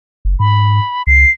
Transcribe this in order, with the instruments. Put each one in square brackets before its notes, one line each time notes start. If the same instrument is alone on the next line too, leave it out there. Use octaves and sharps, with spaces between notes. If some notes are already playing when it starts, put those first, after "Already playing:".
[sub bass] F#1
[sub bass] G#2 [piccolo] B5
[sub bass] C#2 [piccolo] C7